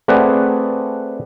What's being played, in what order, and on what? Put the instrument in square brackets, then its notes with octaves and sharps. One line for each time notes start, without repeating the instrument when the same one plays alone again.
[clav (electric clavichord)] A3 C4 G#4 B4 D5 F#5